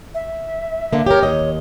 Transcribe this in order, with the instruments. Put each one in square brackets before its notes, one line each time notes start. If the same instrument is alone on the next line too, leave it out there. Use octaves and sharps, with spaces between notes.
[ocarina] E5
[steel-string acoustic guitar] D3 A#3
[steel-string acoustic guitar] G4 A#4 [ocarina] C#5
[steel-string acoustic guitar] D#2 D#5 [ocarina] C#5